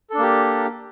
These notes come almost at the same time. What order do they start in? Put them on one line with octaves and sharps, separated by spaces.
A4 D4 A#3 G4